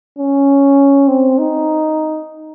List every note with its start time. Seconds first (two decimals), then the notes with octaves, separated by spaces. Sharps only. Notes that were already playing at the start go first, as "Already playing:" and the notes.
0.19 C#4
1.08 C4
1.39 D#4